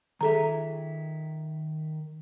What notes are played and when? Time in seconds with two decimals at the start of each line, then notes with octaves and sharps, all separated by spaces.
0.21 D#3 G#4 A4 E5 A#5